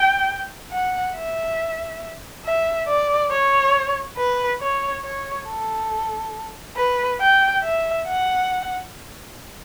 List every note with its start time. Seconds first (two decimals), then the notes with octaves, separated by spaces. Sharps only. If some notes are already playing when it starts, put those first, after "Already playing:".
Already playing: G5
0.71 F#5
1.15 E5
2.45 E5
2.88 D5
3.31 C#5
4.17 B4
4.61 C#5
5.04 C#5
5.47 A4
6.77 B4
7.21 G5
7.64 E5
8.07 F#5